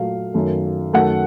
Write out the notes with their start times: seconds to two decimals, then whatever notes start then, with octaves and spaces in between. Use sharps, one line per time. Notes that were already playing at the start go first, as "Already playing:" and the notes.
Already playing: A#2 F#3 A3 F5
0.34 F#2 D#3 A3
0.93 F#2 D#3 A3 F#5